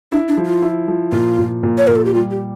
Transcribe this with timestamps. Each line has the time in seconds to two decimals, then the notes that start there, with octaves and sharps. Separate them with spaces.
0.12 D4 E4
0.28 D4
0.37 F3
0.46 F4
0.62 E4
0.88 F3
1.12 A#2 F4
1.39 A#2
1.63 A#2
1.78 C#5
1.87 A#2 A#4
1.96 A4
2.05 G4
2.14 G3 F4
2.31 G4